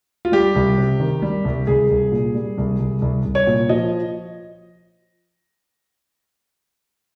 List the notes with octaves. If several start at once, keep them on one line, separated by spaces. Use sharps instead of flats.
F4
G3 G4
C2
C3
D#3
G3
C2
C2 G#4
C2
A#2
G3
C2
C2
C2
C2
C#5
A#2
F3 D#5